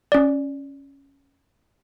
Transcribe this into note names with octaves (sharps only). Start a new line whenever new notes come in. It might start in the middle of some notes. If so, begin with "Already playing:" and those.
C#4 D5